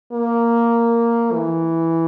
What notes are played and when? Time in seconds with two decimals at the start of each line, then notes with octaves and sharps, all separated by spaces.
0.12 A#3
1.33 E3